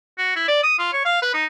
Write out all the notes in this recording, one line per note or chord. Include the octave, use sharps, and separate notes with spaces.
F#4
E4
D5
D#6
F4
C#5
F5
B4
D#4